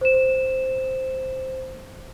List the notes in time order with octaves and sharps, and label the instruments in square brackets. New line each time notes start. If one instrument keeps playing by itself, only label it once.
[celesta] C5 E7